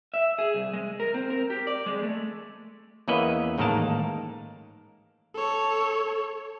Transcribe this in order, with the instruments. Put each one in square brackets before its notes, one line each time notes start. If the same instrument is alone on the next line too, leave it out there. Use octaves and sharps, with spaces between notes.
[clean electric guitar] E5
G#4
C2
G#3
A#4
C4
A#4
G4
D5
G#3
A3
[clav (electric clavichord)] E2 A#3 C#4 B4 D#5 E5
A1 G#2 D#3 A#3 A#4 A5
[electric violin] A4 C#5